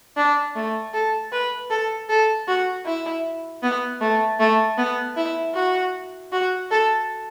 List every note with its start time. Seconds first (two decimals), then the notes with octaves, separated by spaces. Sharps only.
0.17 D4
0.56 A3
0.94 A4
1.32 B4
1.70 A4
2.09 A4
2.48 F#4
2.86 E4
3.63 B3
4.01 A3
4.40 A3
4.78 B3
5.17 E4
5.55 F#4
6.32 F#4
6.71 A4